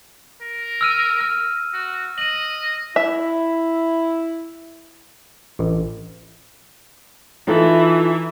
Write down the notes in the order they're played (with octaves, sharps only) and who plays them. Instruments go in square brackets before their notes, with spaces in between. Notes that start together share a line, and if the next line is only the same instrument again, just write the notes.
[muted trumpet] A#4
[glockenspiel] E6 F6 D#7
F6
[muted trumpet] F#4
[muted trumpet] D#5 [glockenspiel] D#7 F#7
[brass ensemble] E4 [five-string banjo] E5
[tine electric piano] A1
[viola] E3 [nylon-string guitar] D#4 F4 A4